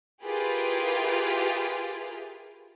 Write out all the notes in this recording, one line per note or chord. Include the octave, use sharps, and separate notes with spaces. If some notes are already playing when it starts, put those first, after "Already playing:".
E4 F4 G4 G#4 A#4 B4